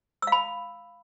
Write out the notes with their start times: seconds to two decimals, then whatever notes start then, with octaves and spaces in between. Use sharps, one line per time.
0.22 E6
0.27 F5
0.32 B5